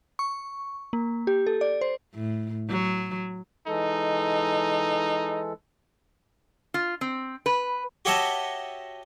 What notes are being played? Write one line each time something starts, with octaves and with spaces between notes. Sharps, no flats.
C#6
A#3
G4
A4
D5
C5
A2
F#3
E3 G#3 D#4 A4
F4
C4
B4
F#4 G4 C#5 D#5 E5 A5